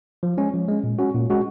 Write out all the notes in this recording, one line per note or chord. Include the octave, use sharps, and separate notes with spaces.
F3
G#3 C#4
F3
G#3 C#4
A#2
G#3 C#4 F#4
A#2
G#3 C#4 F#4